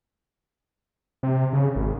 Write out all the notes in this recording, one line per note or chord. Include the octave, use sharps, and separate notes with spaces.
C3
C#3
G#1